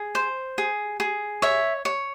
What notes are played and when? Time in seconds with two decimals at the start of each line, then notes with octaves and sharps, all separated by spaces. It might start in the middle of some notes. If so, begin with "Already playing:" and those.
Already playing: G#4
0.15 C5
0.58 G#4
1.00 G#4
1.42 C#5 E5
1.85 C#5